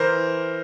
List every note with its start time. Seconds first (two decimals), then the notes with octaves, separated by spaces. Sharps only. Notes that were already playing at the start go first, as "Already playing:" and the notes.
Already playing: E3 A#4 C5